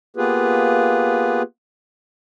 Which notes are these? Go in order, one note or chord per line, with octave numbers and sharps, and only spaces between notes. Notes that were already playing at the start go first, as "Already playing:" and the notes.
A#3 B3 F4 G4 G#4 B4